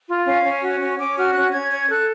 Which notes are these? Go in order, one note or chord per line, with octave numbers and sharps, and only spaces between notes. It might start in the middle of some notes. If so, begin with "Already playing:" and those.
F4
C#4 F5
C#4
F#4
C#4
C#4 D6
F#4 F6
C#4 F#6
C#4 G#6
C#5 G#6
A4 F#6